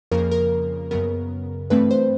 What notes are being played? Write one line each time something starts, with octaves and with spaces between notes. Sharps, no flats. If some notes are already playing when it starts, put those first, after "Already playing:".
F2 C#3 F3 A#3 A#4
A#4
F#2 C#3 F#3 B3 A#4
G2 E3 A3 C4 B4
C5